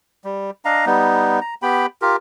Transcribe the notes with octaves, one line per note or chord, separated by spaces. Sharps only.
G3
D4 D#5 F5 A#5
G3 B3 D#4
A#5
B3 G4 G5 B5
F4 G4 A#4